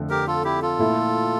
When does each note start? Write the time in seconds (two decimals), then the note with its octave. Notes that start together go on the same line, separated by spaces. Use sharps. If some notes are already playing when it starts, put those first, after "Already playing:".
Already playing: F2 D3 A3
0.10 G4 A#4
0.27 F4 A4
0.44 E4 G4
0.62 F4 A4
0.78 A#2 A3 E4